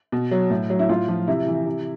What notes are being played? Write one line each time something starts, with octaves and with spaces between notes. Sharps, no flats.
B2
F#3
A2
F#3
E4
A2 F4
F3
C3 E4
E3
C3